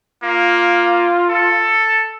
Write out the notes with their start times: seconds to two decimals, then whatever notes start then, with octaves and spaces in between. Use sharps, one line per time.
0.23 A#3 F4
1.29 A4